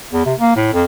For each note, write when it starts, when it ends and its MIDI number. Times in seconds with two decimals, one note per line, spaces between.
0.13 0.25 40
0.26 0.34 48
0.39 0.54 58
0.56 0.69 45
0.73 0.84 41